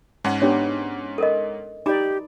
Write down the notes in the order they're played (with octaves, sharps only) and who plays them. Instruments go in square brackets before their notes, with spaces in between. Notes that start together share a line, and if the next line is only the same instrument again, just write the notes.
[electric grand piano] G#2 C#4 F#5 [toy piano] D#4
[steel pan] B3 D4 G4 [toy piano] C#5
[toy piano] A4 A#4 D#5
[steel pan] D#4 D5 [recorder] G4 [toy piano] A#5 B5 D6